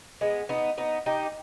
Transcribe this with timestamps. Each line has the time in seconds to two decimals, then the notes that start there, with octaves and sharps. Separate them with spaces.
0.21 G#3 B3
0.49 B3 D#4
0.78 B3 D#4
1.06 D#4 G4